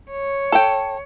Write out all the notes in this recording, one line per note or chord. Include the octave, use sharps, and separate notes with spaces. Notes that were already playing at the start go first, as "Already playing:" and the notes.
C#5
A4 G5